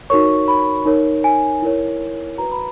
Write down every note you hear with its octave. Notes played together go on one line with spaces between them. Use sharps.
D#4 F#4 A#4 C#5 C#6
B5
D#4 A#4 C#5
G#5
E4 A#4 C#5
F#4 B4 A#5
B5